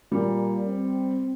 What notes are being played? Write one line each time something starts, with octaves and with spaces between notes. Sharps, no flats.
A#2 G3
C4